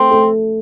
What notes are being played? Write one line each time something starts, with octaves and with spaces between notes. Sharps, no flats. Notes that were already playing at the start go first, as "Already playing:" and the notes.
Already playing: A3 C4
A3